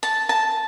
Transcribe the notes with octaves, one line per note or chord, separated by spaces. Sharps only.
A5
A5